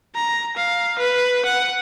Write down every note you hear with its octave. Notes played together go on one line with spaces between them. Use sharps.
A#5
F5
B4
F#5